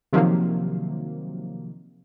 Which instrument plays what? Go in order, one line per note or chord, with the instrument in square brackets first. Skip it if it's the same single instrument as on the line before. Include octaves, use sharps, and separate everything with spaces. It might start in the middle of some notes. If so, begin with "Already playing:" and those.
[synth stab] C3 D#3 F3 F#3 A#3